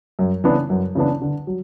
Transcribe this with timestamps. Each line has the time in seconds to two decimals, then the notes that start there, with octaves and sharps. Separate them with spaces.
0.19 F#2
0.44 C#3 E3 B3 D4
0.70 F#2
0.95 C#3 E3 B3 D4
1.22 D3
1.47 F#3